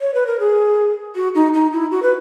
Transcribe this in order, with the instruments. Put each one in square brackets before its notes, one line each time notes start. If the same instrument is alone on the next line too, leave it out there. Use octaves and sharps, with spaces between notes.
[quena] C#5
B4
A#4
G#4
F#4
D#4
D#4
E4
F#4
B4